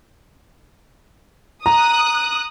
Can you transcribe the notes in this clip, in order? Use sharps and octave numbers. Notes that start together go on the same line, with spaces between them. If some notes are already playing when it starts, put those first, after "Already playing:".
A#5 D#6 F#6